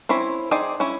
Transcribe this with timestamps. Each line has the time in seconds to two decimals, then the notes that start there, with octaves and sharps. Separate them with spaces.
0.09 C4 C#4 E4 B5
0.51 D#4 G#4 C5 D5 G5
0.80 C#4 E4